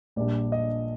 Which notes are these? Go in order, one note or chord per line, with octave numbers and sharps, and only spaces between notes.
A#1 A#2 G3 D4 D5
D#5